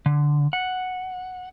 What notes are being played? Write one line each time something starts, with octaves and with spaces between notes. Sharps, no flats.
D3
F#5